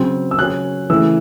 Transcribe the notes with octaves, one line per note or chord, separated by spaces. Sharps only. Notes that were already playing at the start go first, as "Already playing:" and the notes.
Already playing: C#3 F#3 C4
E6
C#3 F#3 C#4 F#6
C#3 E3 A3 E6